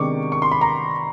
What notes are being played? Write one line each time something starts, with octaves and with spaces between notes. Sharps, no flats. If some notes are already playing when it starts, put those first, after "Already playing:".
Already playing: C3 D#3 G#3 B3 D4 C#6 D6
C#6
C6
B5
A#5